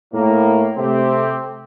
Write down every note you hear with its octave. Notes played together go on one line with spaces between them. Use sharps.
A2 A#3
C3 A3 C4 G4